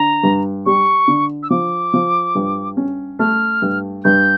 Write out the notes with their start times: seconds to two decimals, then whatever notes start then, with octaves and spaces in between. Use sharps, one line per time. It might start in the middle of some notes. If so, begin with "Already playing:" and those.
Already playing: D3 A#5
0.23 G2
0.66 G3 C#6
1.08 D3
1.43 E6
1.50 F3 D6
1.94 F3
2.35 G2
2.77 C#4
3.19 A3 F6
3.62 G2
4.05 G2 G6